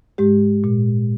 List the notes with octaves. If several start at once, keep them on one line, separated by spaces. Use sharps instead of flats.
G#2 G#3 G4
A#2